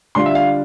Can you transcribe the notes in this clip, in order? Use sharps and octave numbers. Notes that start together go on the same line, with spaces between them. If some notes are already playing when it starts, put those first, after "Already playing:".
D3 G3 D4 F4 C6
E5
F5